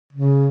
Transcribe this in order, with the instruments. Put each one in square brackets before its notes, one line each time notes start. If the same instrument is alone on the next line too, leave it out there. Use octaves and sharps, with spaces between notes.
[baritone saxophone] C#3